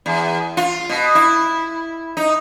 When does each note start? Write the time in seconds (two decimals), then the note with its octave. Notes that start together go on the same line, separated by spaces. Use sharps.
0.06 E2
0.57 F4
0.90 B2
1.15 E4
2.17 D#4